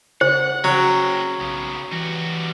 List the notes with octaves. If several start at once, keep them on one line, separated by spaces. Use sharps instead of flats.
C#3 C5 F#5
C#3 F#3 C#4 G5
B1 C#3 B3
E3 G3 F#4